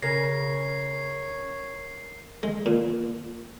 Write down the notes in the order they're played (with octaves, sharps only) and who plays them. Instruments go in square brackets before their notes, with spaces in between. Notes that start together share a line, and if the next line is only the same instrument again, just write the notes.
[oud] C#3 [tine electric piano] A#4 A#6 [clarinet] C#5 [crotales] C7
[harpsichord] G#3
A#2